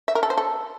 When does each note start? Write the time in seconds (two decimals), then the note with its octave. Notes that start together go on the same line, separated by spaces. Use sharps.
0.08 E5
0.15 A#4
0.23 A4
0.30 C5
0.38 A4